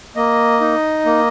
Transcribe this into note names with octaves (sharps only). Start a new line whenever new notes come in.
A#3 D#5
D#4
A#3